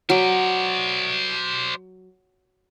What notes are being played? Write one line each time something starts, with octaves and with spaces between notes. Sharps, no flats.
F#3 C5 D5